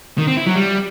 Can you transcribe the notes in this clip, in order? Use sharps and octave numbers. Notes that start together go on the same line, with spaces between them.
D#3
C4
E4
F#3
G3